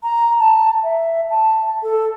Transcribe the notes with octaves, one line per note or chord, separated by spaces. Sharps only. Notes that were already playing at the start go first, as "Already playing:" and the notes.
A#5
A5
E5
A5
A4